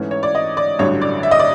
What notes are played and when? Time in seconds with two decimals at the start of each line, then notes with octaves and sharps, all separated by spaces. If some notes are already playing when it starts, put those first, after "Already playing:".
Already playing: G#2 E3 A3 C#4
0.11 C#5
0.23 D5
0.35 D#5
0.57 D5
0.79 A1 G2 D3 F#3 C#5
1.01 D5
1.23 E5
1.31 D#5
1.40 D5